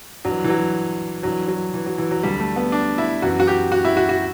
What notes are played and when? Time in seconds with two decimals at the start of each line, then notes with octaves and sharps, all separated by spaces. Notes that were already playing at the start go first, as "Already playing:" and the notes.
0.25 G2 E3 F#3
0.44 E3
0.50 F#3
1.23 G2 E3 F#3
1.48 F#3
1.74 E3
1.86 F#3
1.98 E3
2.11 F#3
2.23 D2 D3 G3
2.40 A3
2.56 B3
2.72 D4
2.98 E4
3.22 F#2 E3 F#4
3.40 F#4
3.47 G4
3.72 F#4
3.85 E4
3.97 F#4
4.09 F#4